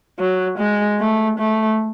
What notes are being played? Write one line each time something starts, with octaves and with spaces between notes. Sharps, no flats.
F#3
G#3
A3
A3